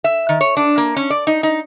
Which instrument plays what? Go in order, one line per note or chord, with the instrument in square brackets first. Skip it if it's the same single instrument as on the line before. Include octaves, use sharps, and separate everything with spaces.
[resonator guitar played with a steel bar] E5
D#3
C#5
D4
A#3
C#4
D5
D#4
D#4